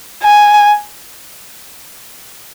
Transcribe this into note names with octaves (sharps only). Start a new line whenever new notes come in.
G#5